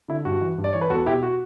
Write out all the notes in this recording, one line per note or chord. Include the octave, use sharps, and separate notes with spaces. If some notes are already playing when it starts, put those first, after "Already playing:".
D3 E4
G2 F#4
E3
G2
D5
E3 C#5
B4
E2 F#4 A4
B2 E4 G4
F#4